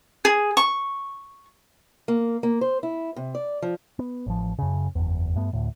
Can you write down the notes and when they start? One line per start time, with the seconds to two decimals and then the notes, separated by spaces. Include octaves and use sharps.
0.25 G#4
0.57 C#6
2.08 A#3
2.43 A#3
2.61 C5
2.83 E4
3.16 C3
3.35 D5
3.62 F3
3.99 B3
4.26 A1 F3
4.59 F#2 C#3
4.95 F#1 E2
5.35 G2 A3 B3
5.53 D2 A2